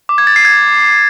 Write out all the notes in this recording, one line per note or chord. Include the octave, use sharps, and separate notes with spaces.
D6
G#6
A6
C7
G#6